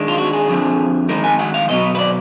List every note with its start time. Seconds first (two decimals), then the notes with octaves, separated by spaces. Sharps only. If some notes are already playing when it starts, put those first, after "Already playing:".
Already playing: D#3 G#3 D4
0.08 F4
0.18 F#4
0.33 G#4
0.48 F2 D3 F3
1.09 D#3 G#3 D#4 A#4
1.24 G#5
1.39 F#5
1.54 F5
1.69 B2 F#3 B3 D#5
1.95 B4
1.99 D5